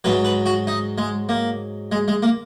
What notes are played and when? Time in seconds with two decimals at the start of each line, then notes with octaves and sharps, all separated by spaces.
0.04 G#2 F#3 B4
0.25 B4
0.46 F#4
0.67 D#4
0.98 G#3
1.29 A#3
1.92 G#3
2.08 G#3
2.23 A#3